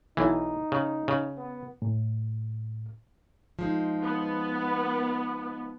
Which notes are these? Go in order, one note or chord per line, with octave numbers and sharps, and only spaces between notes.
B1 E3 D#4
C#3
C#3
B3
A2
F3 G#3 D#4
B3